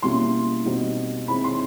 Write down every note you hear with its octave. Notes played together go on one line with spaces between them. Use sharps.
B2 G3 A#3 C#4 E4 C6
B2 G3 C4 D#4
C3 D#3 G#3 C4 E4 B5
C6